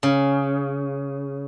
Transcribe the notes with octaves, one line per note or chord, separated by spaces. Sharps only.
C#3